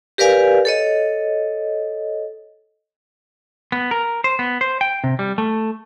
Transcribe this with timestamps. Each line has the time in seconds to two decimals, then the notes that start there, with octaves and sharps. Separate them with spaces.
0.18 G4 A#4 B4 D5 F5 G#5
0.65 A4 C#5 D#5
3.72 B3
3.91 A#4
4.24 C5
4.39 B3
4.61 C5
4.81 G5
5.04 C3
5.19 G3
5.38 A3